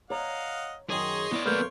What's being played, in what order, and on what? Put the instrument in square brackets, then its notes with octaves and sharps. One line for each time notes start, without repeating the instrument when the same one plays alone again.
[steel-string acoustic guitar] C#5 A#5 [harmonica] D#5 F5 F#5
[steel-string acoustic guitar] F#2 D#3 F#3 [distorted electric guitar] G#4 [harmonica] C#5 D#5 C6
[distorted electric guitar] B3 D5 [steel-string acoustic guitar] E4
[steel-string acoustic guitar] F#3 A3 A#3 [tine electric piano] B4 F6 G6 [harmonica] C#5 C6